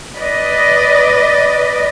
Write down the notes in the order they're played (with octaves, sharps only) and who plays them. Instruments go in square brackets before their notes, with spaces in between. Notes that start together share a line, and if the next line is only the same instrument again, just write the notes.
[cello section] B4 D5 D#5